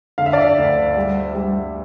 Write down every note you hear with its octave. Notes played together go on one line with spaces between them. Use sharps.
D3 F5
E5
D5
E5
D2
G3
G3